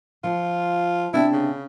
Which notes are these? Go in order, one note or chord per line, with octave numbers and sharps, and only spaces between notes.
F3 F4
C3 B3 D4 E4
C#3